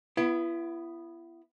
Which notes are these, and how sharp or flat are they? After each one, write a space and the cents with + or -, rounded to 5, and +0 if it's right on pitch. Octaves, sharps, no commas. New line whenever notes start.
B3 +0 E4 +35